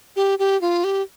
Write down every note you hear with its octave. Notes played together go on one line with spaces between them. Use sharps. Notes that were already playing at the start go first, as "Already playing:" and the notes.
G4
G4
F4
G4